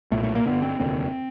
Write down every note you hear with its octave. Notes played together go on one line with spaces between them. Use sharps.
B1 A#2 A3
A3
A#3
G1 F#2 D3 B3
C4
F1 D#2 D3 C4